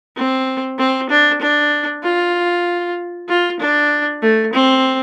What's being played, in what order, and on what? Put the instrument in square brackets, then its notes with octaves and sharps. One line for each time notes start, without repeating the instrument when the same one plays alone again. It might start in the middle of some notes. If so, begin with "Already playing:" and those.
[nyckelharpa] C4
C4
D4
D4
F4
F4
D4
A3
C4